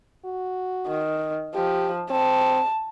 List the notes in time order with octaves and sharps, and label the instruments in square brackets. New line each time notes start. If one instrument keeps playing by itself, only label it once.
[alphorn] F#4
[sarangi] D#3
[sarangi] F3 [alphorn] G4
[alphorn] C4 [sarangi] A5